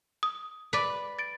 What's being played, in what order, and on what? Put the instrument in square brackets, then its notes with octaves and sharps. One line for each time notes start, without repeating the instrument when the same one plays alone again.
[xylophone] D#6
[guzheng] B4 D5
[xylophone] A6 D7